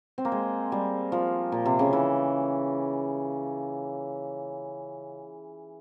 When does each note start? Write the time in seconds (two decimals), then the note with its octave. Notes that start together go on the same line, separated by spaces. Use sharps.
0.18 C4
0.25 A#3
0.32 G#3
0.72 G3
1.12 F3
1.52 A#2
1.66 C3
1.79 C#3
1.93 E3